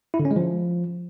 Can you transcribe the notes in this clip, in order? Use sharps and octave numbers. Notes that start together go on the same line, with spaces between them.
E4
D3
C#4
G#3
F3